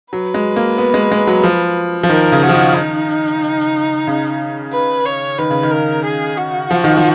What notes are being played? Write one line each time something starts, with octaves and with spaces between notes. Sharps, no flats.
F#3 B4
G#3
A#3
B3
G#3
G#3
F#3
F3
F3
D#3 A#4
C#3
F#4
F3
D#3
D#4
C#3
B4
C#5
D#3 B4
C#3
D#3
A#4
G#4
F#4
F3
D#3
F3